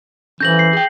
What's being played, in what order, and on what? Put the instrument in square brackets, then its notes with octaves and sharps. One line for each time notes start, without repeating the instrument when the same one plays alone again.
[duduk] E3 [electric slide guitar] C#4 A4 C5 [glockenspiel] G6 A#6 F#7
[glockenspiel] C7
[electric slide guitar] G#4 G5